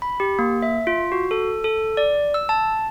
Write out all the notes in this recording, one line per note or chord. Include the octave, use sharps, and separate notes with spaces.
B5
G4
A#3
E5
F4
F#4
A4
A4
D5
E6
A5